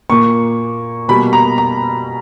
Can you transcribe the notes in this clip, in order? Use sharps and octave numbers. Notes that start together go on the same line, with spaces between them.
A#2 A#3 C#6
B2 G3 A#3 B5
A#5
A#5